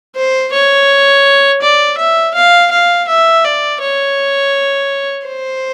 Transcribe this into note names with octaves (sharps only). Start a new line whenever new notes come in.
C5
C#5
D5
E5
F5
F5
E5
D5
C#5
C5